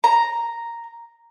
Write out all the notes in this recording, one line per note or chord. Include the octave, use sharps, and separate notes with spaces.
A#5